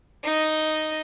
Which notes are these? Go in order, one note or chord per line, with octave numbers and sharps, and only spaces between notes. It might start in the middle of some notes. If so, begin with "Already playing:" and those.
D#4 D#5